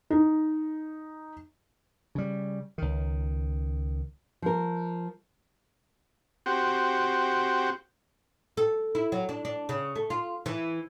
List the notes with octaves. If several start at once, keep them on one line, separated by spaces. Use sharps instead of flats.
D#4
C#3 G3
C#2 D#3
F3 A#4
C4 F#4 G4
A4
E4
F#3
D4
D4
C#3
A3
F4
E3